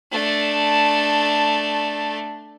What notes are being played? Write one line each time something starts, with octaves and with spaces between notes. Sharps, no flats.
A3 D4